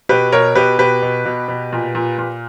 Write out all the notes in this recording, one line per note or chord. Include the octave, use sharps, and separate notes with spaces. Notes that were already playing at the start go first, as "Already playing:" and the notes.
B2 G4 B4
B2 A#4 C#5
B2 G4 B4
B2 G4 B4
B2
B2
B2
A#2
A#2
A#2